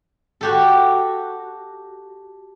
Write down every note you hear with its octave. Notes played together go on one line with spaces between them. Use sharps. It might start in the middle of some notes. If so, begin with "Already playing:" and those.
F#4 G4 A4